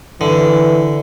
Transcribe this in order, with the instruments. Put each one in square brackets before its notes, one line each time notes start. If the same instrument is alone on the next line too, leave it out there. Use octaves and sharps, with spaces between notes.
[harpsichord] D3 [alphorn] E3